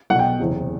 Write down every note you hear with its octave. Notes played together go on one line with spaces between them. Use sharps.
B1 B2 F#5 G5
F#1 E2 C3